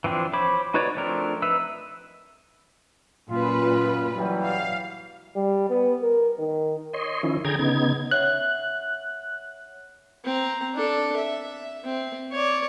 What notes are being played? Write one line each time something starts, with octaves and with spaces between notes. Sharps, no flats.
E3 F3 C4 D4
C5 C#5 B5 D6
D#4 F#4 B4 C#5 D5
F3 A3 C4 D4 A#4
D#4 B4 E5 E6
F#2 A#2 F4 B4
E3 F#3 G3
F5
G3
B3
A#4
D#3
C#5 D#5 C6
D#3 F3 C#4 E4
D3 G#4 G5 A#5 G#6
C#3 B3 D#4 G#6
C#5 E5 F#5 F#6
C4 A#5
D4 A4
E5
C4
C#5 D5